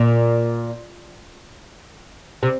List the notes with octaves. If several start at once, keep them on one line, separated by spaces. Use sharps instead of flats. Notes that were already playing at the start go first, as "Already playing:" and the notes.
Already playing: A#2
C3